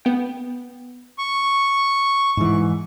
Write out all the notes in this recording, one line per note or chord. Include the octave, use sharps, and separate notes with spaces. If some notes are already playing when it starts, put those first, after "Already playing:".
B3 G5
C#6
G#2 E3